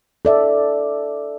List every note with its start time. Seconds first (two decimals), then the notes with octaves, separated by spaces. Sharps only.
0.25 A4 D5 E5